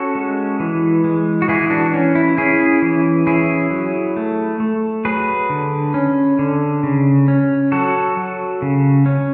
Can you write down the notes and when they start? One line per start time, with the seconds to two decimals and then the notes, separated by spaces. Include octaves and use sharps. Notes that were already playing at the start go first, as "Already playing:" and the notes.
Already playing: C#4 F#4 A4
0.15 G#3
0.60 E3
1.04 G#3
1.42 F#4
1.48 E3 E4 G#4
1.70 D4 F#4
1.94 C#4
2.15 E4
2.37 C#4 E4 G#4
2.82 E3
3.27 C#4 E4 G#4
3.71 F#3
4.16 A3
4.60 A3
5.05 F#3 G#4 B4
5.50 D3
5.94 C#4
6.39 D3
6.83 C#3
7.28 C#4
7.72 F#3 F#4 A4
8.17 F#3
8.62 C#3
9.06 C#4